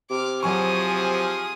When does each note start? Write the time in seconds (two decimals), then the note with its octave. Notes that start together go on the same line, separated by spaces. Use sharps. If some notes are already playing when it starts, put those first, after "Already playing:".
0.10 C3 D6 F6
0.43 F3 F#3 G#4 G#5 C#6 D#6